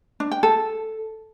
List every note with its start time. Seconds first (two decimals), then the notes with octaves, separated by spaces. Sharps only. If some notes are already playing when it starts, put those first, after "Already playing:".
0.20 D4
0.31 G5
0.43 A4